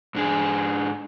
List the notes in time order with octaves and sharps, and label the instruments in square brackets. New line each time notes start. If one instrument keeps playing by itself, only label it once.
[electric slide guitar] G#2 D4 G#4